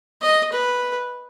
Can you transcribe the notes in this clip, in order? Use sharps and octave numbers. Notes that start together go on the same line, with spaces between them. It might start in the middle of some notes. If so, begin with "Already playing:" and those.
D#5
B4